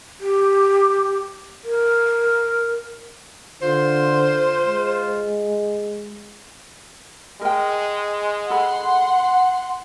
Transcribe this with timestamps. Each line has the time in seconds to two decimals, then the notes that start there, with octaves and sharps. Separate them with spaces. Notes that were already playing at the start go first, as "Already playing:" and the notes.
0.20 G4
1.64 A#4
3.62 D3 F4 C5
4.65 G#3
7.41 G#3 A#4 G5
8.50 A4 F#5 B5 C6